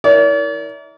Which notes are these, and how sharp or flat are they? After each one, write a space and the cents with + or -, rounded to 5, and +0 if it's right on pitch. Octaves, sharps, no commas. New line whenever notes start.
E4 -40 A#4 +0 D5 -45